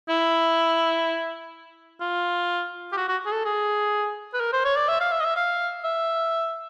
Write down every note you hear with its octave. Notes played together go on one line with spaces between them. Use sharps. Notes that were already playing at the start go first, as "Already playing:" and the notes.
E4
F4
G4
F#4
F#4
G#4
A4
G#4
B4
A#4
C5
C#5
D5
E5
F5
E5
D#5
E5
F5
E5